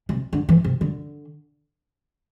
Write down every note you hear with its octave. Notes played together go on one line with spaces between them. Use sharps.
C3
D3
E3
C3
D3